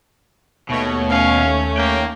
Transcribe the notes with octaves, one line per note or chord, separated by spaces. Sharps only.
D#2 B2 A3 C#5
C#4 F5
A#3 G5